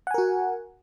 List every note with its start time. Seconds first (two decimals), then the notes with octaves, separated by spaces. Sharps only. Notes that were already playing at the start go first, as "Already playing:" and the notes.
0.07 F#5
0.11 G#5
0.14 A#4
0.18 F#4